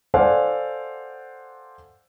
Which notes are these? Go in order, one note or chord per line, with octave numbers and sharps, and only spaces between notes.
A4 C5 D5 F5 F#5 G#5